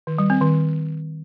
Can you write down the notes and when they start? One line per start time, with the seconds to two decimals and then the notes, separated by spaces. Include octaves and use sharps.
0.07 D#3
0.18 G3
0.30 C4
0.41 D#3